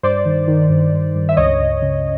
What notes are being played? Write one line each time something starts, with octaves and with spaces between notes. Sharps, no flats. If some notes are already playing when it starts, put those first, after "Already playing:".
G2 C5 D5
D#3
D#3
G2
G2
G2
E5
C#2 C#5 D#5
C#2
C#3